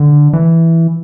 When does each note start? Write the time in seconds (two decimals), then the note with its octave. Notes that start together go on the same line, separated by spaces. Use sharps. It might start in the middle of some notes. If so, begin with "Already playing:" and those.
Already playing: D3
0.33 E3